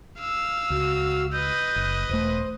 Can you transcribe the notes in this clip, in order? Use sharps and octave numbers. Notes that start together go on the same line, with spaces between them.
F5 E6
C#2 F#4
B4 D#5 G6
F#1
E1 A3 C5